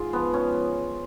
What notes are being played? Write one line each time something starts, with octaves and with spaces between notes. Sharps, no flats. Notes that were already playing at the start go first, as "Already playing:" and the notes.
Already playing: G#2 F4 G#4
F3 B3
C#4